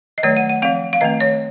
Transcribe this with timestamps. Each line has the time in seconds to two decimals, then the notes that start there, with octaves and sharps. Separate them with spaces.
0.18 D#5
0.23 D#3 F#3 A3 C#5
0.37 F#5
0.49 F#5
0.62 F3 C4 F5
0.93 F5
1.01 D#3 A3 C4 D#5
1.21 C#5